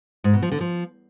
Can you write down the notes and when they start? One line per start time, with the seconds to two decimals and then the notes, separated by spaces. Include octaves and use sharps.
0.24 G#2
0.33 B2
0.42 F3
0.52 D3
0.61 F3